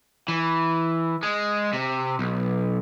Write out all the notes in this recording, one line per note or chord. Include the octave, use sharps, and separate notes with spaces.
E3
G#3
C3
B1